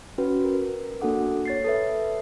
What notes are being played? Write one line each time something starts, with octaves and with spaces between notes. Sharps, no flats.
C#4 F#4 B4
A#4
A#3 D4 F#4 A4 F#5 D6
C#5 A6 C7
A4 B4 E5